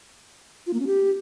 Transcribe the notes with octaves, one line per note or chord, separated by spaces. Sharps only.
F4
A#3
C#4
G4